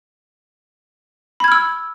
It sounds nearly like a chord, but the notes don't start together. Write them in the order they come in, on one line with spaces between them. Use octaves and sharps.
B5 G#6 F6 E6